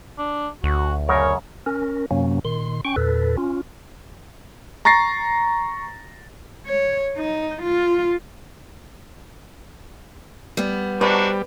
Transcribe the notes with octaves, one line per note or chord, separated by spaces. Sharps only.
D4
D2 F#4
F#2 C#3 A#4 C#5
C#4 A#4
F#2 C3 F#3 A#3 C#4
A#2 D#3 C6
C#4 G5 C#6
E2 A#2 A4 B4
C#4 F4
A#5 C#6 A6 A#6 C7
C#5
D#4
F4
G3 B3
G3 C4 D4 D#4 F#4 B4